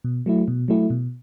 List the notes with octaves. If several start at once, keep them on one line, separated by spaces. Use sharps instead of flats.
B2
F#3 A3 E4
B2
F#3 A3 E4
B2